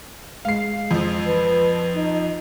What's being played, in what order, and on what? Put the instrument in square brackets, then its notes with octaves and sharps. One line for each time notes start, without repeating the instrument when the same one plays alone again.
[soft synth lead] G#3 [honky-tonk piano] F5 C7
[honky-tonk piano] F2 F3
[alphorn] B4 [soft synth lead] A5
[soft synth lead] A6
[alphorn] D#4